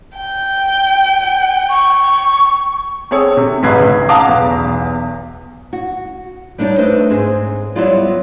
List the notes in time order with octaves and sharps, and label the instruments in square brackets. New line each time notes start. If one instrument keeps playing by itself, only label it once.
[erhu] G5
[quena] C#6
[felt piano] C4 G#4 A4 C#5
C3
A1 G#2 D#4 B4 G#6 C7
C#2
F5 F#5 A5 A#5 D6 D#6
B1 E2
[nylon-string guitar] F#4
G3 D4 D#4 F#4 C#5 D5
A3 D4 B4 C5 D#5
G#2 C4 G#4
F#3 G3 B3 E4 F4 D5